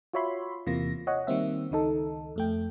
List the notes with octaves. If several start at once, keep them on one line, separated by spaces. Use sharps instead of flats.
F4 F#4 C#5 E5 B5 C6
E2 C3 E3 A#3 F4 A#6
C#5 D#5 F#5
D#3 G3 A#3 C4 E5
C#2 D#3 D#4 A4
F2 A3 G5